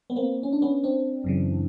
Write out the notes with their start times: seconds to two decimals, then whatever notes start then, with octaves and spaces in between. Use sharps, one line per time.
0.10 B3
0.16 A#3 C4
0.43 C#4
0.53 D4
0.62 B3 C#4
0.84 C4 D4
1.24 F#2 C#3 E3